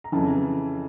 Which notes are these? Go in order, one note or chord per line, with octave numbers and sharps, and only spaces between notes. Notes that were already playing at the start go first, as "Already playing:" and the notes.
A#5
F2 C#3 E3 A5